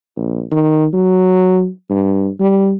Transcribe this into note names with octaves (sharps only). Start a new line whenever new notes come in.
A#1
D#3
F#3
G2
G3